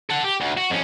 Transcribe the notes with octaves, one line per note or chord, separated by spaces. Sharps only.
A4 F#5
G4
D2
F#4
F2 C#4